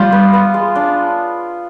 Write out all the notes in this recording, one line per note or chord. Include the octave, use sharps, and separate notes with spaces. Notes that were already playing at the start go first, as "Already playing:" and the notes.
Already playing: G3 F4
B3
B3
G#3
D4